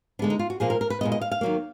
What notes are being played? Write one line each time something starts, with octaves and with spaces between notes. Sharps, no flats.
D3 G#3 B3 D4
D#4
F4
F#4
A#2 F3 A#3 G#4
A#4
A#4
B4
A#2 G#3 B3 D#5
D#5
F5
F5
D#3 F#3 A#3